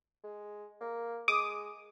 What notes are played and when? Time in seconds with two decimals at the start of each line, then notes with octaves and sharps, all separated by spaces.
0.24 G#3
0.81 A#3
1.28 G#3 D6 D#6